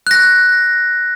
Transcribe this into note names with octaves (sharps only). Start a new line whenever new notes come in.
F#6 A#6